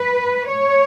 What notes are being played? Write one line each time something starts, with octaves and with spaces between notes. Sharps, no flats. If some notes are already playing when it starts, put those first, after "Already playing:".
Already playing: B4
C#5